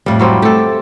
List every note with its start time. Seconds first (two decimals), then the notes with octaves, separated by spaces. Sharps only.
0.06 F2 A2 G3
0.19 F#3 G3 C4
0.42 A3 G4 A4